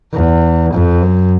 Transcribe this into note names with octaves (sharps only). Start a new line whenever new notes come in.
E2
F2
F#2